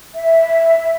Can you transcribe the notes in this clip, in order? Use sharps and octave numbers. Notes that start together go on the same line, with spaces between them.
E5